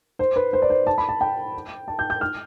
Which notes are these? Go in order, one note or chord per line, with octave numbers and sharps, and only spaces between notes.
C5
B4
C5
D5
C5
A5
B5
A5
G5
A5
G6
G6
F6